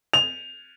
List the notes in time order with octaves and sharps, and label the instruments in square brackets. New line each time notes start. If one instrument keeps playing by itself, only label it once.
[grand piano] F7